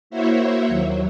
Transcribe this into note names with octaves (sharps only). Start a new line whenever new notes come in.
A#3 E4 F#4 C5 C#5 E5
D#2 F#3